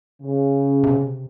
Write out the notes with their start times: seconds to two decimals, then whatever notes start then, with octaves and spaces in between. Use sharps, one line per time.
0.21 C#3
0.84 C3